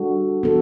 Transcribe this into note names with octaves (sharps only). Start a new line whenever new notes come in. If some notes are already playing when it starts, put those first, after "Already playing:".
Already playing: G3 D4 F#4 A4
E3 B3 F#4 A4